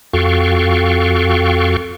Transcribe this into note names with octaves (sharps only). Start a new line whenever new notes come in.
F2 F#4 A4 F5 G5 C#6